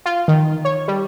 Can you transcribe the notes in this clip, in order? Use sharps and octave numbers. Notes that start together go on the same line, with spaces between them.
F4
D#3
C#5
G3